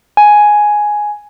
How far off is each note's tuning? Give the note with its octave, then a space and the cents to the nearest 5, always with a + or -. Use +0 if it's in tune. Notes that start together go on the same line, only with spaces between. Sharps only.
G#5 +5